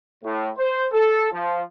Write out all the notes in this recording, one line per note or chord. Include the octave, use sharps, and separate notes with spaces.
A2
C5
A4
F3